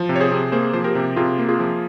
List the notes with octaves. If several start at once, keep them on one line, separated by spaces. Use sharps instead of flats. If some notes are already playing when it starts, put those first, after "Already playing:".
Already playing: F3
C3
C#5
G#4 C5
C3
A#3 G#4 C5
F3 C5
G4 A#4
C3
C3 F4 G#4
A#3
F4 G#4
F3